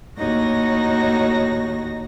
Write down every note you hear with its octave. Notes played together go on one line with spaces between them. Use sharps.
D#2 A2 D#4 F#4 C#5 A#6